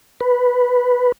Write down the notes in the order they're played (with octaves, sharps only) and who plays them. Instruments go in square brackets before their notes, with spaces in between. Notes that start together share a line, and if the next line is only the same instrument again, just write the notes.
[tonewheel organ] B4